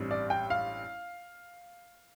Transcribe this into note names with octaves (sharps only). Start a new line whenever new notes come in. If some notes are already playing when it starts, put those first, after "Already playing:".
Already playing: A1 G2 G3 C4
D5
G5
F5